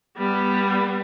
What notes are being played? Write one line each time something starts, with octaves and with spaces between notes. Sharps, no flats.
G3 B3